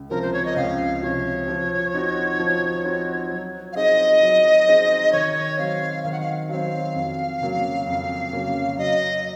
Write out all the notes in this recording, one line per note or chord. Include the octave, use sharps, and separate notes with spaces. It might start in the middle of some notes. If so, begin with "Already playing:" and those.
Already playing: C#2
C3 F3 A#4
C5
C#5
D#5
C#2 F5
C3 F3 C#5
F3
C4 D#4 F#4
F3
C4 D#4 F#4
F#3
F5
C4 D#4 G#4 D#5
F#3
C4 D#4 G#4
D#3 C#5
F#3 C4 F5
D#3 F5
F#5
F5
F#3 C4 F5
F2
C#3 F#3 A#3
F2
C#3 F#3 A#3
F#3 D#5